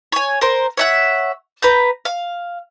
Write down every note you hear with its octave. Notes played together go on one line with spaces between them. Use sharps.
C#5 G#5
A#4 C5
C#5 E5 F#5
B4 A#5 G6
F5